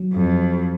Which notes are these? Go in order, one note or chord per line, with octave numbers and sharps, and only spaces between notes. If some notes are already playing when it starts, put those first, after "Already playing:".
Already playing: F#3
F2